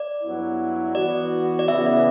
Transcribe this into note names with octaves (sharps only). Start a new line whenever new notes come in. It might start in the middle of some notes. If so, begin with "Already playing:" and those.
Already playing: D5
G2 F#3 B3 E4
E3 B3 F#4 D5
D5
C#3 E3 B3 E5
D5